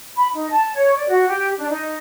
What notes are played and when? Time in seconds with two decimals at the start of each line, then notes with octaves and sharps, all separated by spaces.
0.16 B5
0.33 D#4
0.50 A5
0.75 C#5
0.95 D5
1.08 F#4
1.28 G4
1.58 D4
1.69 D#4